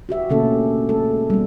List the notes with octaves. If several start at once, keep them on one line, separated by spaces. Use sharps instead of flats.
F#4 G4 E5
B2 D3 A3 A#3 C#4 A4
G#3 A4
G3 B3